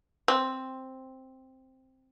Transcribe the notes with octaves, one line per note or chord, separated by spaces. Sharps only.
C4